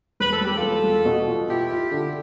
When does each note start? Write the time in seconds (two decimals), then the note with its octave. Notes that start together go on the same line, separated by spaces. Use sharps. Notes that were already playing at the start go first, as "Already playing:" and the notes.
0.20 E1 B4
0.32 A4
0.41 E1 G4
0.55 F4 A4
0.62 E1
0.84 E1
1.05 B2
1.27 F4
1.48 E4 F4 G4
1.70 F4
1.91 D3